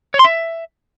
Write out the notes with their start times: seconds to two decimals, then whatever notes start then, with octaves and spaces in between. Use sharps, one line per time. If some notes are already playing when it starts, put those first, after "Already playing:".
0.14 C#5
0.19 C6
0.24 E5